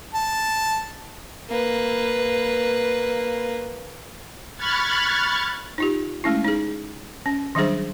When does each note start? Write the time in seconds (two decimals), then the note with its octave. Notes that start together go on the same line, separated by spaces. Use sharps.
0.14 A5
1.49 A#3 B4
4.57 B5 C#6 F6 F#6 G#6 A6
5.78 D#4 F4 G4
6.24 G#3 A3 C#4 E4
6.44 D#4 G#4
7.26 C#4
7.55 D#3 F#3 G3 D4 G#4 C5